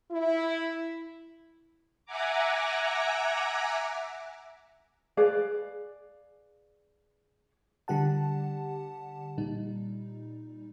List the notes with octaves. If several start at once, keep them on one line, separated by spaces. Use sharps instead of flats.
E4
E5 F#5 G#5 A#5 D6
G#4 B4 D5 F5
D3 G3 G4 F#5 A5
A#2 G3 D#4